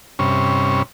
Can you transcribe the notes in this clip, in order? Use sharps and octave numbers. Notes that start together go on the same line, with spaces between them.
G2 C3 C#4